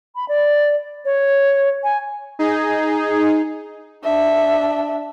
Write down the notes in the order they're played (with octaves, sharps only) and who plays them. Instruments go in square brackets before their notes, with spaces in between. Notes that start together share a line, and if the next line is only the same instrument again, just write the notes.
[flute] B5
D5
C#5
G#5
[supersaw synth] D#4 G#4
[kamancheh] D4 E5